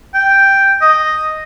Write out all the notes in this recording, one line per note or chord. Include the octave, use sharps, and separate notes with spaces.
G5
D#5